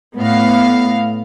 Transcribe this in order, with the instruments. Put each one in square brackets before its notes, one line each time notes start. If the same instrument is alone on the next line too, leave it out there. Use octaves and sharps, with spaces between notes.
[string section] A2 B3 F5